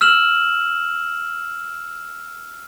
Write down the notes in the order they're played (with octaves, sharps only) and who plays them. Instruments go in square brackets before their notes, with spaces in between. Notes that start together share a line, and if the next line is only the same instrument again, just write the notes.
[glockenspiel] E6 F6 E7 F#7